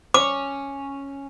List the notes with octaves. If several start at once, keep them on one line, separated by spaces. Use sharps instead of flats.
C#4 D6